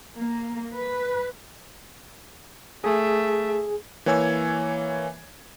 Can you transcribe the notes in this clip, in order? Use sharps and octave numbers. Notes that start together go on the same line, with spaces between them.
A#3
B4
A3 G#4 E5
E3 A#3 C#5 G#5 E6 G#6